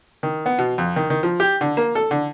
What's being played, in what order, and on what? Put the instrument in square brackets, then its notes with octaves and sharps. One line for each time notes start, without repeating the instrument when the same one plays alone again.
[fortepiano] D#3
B3
B2
F2
D#3
D#3
F3
G4
D3
A#3
A4
D3